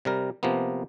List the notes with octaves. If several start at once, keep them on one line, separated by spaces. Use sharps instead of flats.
C3 G3 A#4
C3 F3 A#3 B3